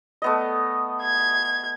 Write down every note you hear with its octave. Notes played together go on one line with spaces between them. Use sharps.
A3 B3 D#5
G#6